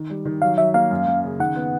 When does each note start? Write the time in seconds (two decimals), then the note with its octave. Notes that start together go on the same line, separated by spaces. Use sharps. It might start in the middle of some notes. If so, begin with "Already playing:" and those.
Already playing: D#3
0.10 G3
0.25 D#3
0.42 F#3 F5
0.58 F#3 E5
0.74 A#3 F5
0.91 F#2
1.07 F#2
1.24 C#3
1.39 D#3 F#5
1.56 B3